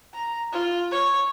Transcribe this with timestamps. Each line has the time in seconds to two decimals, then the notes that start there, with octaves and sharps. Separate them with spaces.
0.14 A#5
0.53 F4
0.91 C#5